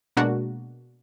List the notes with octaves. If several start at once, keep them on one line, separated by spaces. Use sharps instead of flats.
B2 G#3 A#3 D4 F#4 A#4